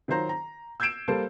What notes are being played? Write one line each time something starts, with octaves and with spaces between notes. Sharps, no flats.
D#3 F#3 F4 C5 A#5
A#5
E6 G6 G#6 C7 D7 E7
G3 A#3 A4 C5